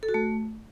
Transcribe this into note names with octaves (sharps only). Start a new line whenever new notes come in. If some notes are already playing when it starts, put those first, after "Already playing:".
A4
F#4
A3